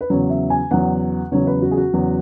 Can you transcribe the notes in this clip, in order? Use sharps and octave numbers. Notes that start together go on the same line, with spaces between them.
B4
E2 C#3 F#3 C#5
E5
G#5
E2 C#3 F#3 F#5
E2 C#3 F#3 C#5
B4
F#4
G#4
F#4
E2 C#3 F#3